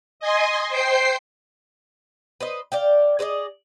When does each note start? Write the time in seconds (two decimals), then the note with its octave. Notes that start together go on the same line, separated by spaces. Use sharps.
0.20 D#5 G#5 C6
0.69 C5 G5 C7
2.40 B4 C5 D#5
2.72 D5 F5 G5
3.19 G#4 C5 D5 D#5